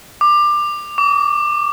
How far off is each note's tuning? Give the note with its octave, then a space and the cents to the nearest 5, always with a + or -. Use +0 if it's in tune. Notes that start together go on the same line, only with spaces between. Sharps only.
D6 +20
D6 -40